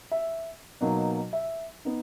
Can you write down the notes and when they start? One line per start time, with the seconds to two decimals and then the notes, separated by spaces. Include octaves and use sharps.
0.12 E5
0.81 B2 F#3 A#3 D#4
1.33 E5
1.85 B3 D#4